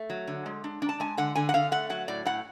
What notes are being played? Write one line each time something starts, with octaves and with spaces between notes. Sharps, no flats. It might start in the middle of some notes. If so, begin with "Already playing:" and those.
Already playing: A3
F#3
D3
G#3
D4
D4
A5
G#3 G#5
D3 F#5
D3 G#5
F#5
D3 F5
A3 F#5
F#3 F#5
A2 D5
A2 F#5